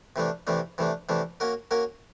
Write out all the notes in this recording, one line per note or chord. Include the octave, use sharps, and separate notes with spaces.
C3 E3 A3 D4
C3 E3 A3 D4
C3 E3 A3 D4
C3 E3 A3 D4
A#3 C#4 F#4 A#4
A#3 C#4 F#4 A#4